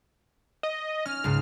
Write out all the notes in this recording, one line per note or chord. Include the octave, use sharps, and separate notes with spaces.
D#5
C#4 F6
C#2 G#2 C#3